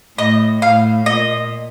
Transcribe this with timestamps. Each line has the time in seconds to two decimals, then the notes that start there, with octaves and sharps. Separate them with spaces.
0.18 A2 D#5
0.62 A2 F5
1.06 A#2 D#5